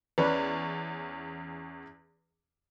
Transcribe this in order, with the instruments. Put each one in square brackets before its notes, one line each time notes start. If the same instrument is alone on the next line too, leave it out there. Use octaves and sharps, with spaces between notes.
[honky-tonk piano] E2 C#4 [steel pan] B4 D5